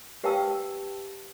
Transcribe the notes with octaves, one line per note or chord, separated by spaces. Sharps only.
G4 B4 F5 G5 A5 E6